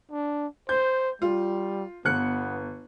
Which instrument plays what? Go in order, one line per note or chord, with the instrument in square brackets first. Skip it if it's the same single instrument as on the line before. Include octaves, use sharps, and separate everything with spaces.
[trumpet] D4
[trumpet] C5 [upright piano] G6
[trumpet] G3 [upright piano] F4
[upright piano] G1 F#6 C#7 [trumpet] B3